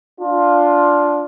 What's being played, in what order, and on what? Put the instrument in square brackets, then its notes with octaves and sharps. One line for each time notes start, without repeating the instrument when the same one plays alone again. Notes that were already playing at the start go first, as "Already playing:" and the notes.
[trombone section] D4 F4